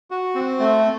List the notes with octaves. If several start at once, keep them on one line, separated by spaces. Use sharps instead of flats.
F#4
C4
A3